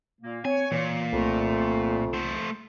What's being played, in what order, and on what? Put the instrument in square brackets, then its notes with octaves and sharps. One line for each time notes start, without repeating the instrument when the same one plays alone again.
[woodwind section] A#2 A#3
[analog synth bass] C4 [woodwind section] C#5 [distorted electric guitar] G#5
[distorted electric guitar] A#2 [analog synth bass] E3
[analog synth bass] C2 [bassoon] F2 [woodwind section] A3
[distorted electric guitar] A3 C5